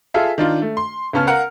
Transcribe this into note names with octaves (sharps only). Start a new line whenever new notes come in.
F4 G#4 A4 E5 F5
D#3 D4 F4
A3
C6
C#2 B3 C#4 A5 F6
A#4 F5 F#5 A#5